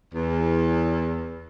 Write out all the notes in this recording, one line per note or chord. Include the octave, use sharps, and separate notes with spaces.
E2